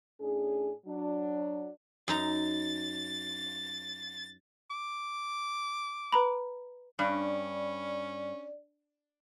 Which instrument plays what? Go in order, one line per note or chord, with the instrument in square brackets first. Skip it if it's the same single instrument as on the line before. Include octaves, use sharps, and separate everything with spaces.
[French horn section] A2 C#4 D4 G#4
F#3 D4
[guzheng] F#2 D#4 A#5 [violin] A6
[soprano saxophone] D6
[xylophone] B4 A#5 B5
[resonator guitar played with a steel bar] G2 [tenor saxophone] C#4 [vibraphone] D5